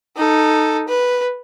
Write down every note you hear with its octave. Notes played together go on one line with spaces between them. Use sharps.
D#4 A4
B4